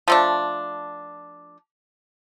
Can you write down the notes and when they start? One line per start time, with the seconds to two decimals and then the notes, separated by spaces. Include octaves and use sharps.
0.08 F3 A3 D4